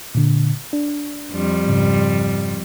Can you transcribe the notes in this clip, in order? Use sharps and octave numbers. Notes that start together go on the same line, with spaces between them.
A#2 D3
D4
F2 G3
G#2 C#3